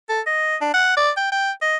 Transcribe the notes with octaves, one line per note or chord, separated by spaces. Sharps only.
A4
D#5
D4
F#5
D5
G5
G5
D#5